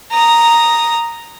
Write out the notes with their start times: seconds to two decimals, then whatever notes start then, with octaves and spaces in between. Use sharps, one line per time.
0.12 A#5 D#6